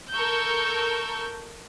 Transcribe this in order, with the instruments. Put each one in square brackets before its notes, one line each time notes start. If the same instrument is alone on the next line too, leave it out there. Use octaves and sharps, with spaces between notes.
[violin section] A4 A#4 C#6 E6 G6